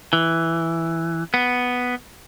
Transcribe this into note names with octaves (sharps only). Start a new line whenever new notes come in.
E3
B3